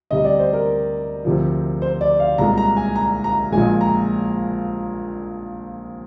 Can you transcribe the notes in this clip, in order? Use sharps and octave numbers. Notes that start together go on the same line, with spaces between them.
D2 C3 G3 D#5
D5
C5
A#4
D2 C3 F3
C5
D5
F5
C2 A#2 G#3 A#5
A#5
G#5
A#5
A#5
A#1 A#2 G#3 G#5
A#5